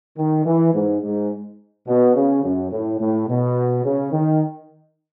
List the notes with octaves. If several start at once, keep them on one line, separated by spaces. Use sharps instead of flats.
D#3
E3
G#2
G#2
B2
C#3
F#2
A2
A2
B2
C#3
D#3